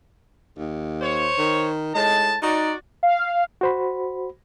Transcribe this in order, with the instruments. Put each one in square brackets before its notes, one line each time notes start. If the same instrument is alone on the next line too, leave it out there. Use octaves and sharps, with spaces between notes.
[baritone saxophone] D#2
[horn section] C5 C#5
[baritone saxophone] D#3
[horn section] A2 D#4 A5 [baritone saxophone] G#3
[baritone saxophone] D#4 [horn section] F#4 D5
[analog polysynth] F5
[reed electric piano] F#4 C5 B5